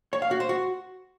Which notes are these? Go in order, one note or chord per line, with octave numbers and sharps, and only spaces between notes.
C#5
F5
F#4
C5
F#4